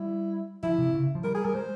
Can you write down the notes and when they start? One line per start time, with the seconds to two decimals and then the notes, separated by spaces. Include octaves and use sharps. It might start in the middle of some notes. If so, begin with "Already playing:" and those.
Already playing: G3 E4
0.63 F3 E4
0.78 C3
0.94 C#3
1.15 F3
1.24 G3 A#4
1.35 G#4
1.45 G3 A#4
1.54 G#3 C5